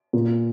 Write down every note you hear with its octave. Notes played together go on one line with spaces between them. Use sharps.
A#2